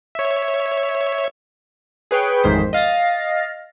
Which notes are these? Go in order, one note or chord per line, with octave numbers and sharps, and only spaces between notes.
C#5 E5
G#4 B4 C#5 G5
A1 F2 G#2 D#3 C5 B6
D#5 F5 A6 A#6